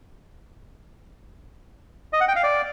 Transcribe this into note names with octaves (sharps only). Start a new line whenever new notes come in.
D#5
F#5
G5
F5
D5